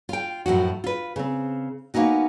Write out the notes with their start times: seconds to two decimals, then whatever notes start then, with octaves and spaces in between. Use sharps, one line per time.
0.09 F4 G5
0.46 F#2 A2 F3 F#4
0.84 F4 B4
1.16 C#3 C4
1.94 A#3 B3 C#4 D#4 F#4